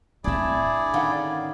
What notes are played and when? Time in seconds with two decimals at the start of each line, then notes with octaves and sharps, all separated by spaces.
0.24 A2 C4 D4 E4 G#4 D5 E5
0.94 D3 D#3 C#4 F5 F#5 B5